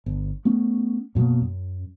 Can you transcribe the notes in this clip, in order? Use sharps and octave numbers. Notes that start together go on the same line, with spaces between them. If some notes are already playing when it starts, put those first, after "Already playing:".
G1
A3 B3 C#4
F#2 B2 F#3 A#3
F#2